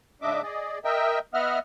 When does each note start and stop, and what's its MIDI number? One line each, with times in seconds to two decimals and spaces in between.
0.22 0.42 44
0.22 0.42 49
0.22 0.42 62
0.22 0.42 75
0.22 0.42 76
0.22 0.42 86
0.43 0.79 68
0.43 0.79 74
0.43 0.79 75
0.85 1.19 70
0.85 1.19 75
0.85 1.19 76
0.85 1.19 79
1.34 1.59 59
1.34 1.59 75
1.34 1.59 76
1.34 1.59 78
1.34 1.59 89